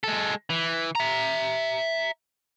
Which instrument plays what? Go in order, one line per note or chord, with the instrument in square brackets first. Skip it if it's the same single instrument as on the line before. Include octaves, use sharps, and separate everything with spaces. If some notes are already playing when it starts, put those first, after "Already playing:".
[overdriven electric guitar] G#3 A4
E3
E5 A#5